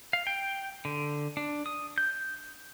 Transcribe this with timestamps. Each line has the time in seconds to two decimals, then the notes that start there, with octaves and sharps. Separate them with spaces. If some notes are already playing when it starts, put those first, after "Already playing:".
0.13 F5
0.27 G5
0.85 D3
1.37 D4
1.66 D#6
1.98 G6